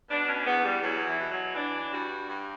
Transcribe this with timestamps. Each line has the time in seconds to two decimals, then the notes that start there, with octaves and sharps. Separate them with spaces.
0.09 B2 D4
0.28 C#4
0.46 E2 B3
0.64 G3
0.82 E2 F#3
1.06 E3
1.19 B2
1.31 F#3
1.55 E3 D4
1.91 G2 F#4
2.28 G2